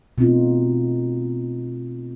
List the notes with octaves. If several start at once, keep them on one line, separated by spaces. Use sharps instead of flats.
B2 A3 C4 D#4 F4